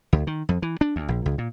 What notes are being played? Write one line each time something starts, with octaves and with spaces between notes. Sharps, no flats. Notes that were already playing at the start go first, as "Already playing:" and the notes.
D2
D#3
F2
E3
D4
D2
A#1
C#2
A#2